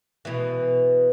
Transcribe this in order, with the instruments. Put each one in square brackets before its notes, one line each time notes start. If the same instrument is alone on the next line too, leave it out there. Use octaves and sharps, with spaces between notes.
[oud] B2 E3